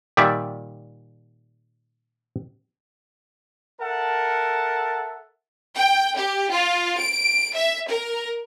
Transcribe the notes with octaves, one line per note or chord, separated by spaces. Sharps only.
A#2 D#3 G3 D5 E5
A4 A#4 E5 F#5 A5
G5
G4
F4
D7
E5
A#4